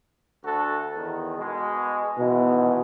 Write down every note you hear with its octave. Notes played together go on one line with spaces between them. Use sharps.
D2 F#4 A4
E2 D#3
B2 G#3
G#2 B2 D#3 E3